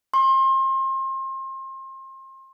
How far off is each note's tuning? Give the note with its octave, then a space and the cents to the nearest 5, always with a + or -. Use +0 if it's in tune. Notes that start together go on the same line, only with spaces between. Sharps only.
C6 +35